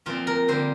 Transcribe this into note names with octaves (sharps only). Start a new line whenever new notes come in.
A#2 F3 C4 F4
A#4
D3 G3 A#3 C5